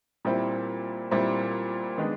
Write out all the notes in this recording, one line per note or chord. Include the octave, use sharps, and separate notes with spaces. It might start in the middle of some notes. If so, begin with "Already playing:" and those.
A#2 G3 C4 E4
A#2 G3 C4 E4
D#3 G#3 B3 D4